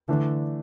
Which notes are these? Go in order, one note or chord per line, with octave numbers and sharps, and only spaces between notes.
D3 E3 A3 D4